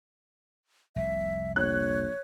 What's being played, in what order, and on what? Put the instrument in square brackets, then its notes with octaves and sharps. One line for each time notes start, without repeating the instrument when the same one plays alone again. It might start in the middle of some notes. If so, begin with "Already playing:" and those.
[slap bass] F1 C2 [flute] E5
[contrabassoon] A#1 [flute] C#5 [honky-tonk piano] F#6